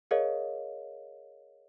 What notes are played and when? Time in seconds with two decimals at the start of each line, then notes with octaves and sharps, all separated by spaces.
0.11 G#4 A#4 C#5 D#5 F5